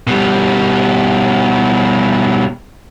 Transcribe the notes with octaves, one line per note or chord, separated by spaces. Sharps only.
B2 G3